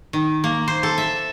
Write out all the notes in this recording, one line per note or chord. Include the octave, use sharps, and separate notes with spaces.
D#3
A#3
C5
A4
E5